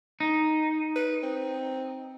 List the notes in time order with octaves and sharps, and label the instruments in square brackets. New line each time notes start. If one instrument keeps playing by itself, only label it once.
[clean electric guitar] D#4
[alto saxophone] B4
C4